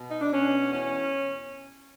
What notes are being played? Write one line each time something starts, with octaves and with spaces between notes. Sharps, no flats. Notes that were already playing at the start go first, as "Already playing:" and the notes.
Already playing: B2
D#4
D4
B2 C#4
E2 C#4